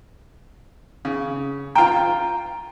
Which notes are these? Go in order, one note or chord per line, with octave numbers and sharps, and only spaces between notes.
C#3
F4 G5 A#5